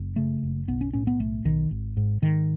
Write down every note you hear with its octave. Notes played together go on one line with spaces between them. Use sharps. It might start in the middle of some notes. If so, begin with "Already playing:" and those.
Already playing: F#1
C#3 A3
F#1
B1 B3
C#4
A2 C#4
B3
B1 A3
B1 D#3
G#1
G#2
G#2 D#3